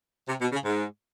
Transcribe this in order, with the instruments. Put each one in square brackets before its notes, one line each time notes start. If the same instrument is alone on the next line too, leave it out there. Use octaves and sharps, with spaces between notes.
[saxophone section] C3
B2
C#3
G#2